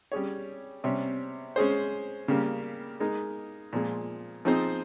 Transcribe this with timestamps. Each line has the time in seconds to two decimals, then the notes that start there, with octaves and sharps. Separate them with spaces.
0.12 G3 C#4 G#4 C#5
0.84 C3 G3 C#4
1.56 G#3 C#4 G#4 C5
2.28 C#3 G3 A#3
3.00 G#3 D#4 A#4
3.73 A#2 F3 G#3
4.45 F3 C4 D#4 G#4 C5